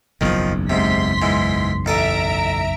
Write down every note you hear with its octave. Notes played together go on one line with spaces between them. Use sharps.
F#1 B1 E2 D#3 F3
G#2 C3 C6 B6
G#2 E3
A1 A4 E5 A#5 D#6 D7